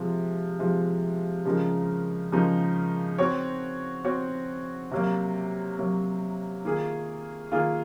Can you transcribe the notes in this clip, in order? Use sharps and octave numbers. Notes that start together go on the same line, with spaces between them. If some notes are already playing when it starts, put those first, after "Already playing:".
Already playing: C3 F3 G#3
C3 F3 G#3
C#3 F3 G#3 D#4 A#4
C#3 F3 G#3 D#4 A#4
C4 F#4 C#5
C4 F#4 C#5
C3 F#3 A#3
C3 F#3 A#3
D#3 A#3 F4 G#4
D#3 A#3 F4 G#4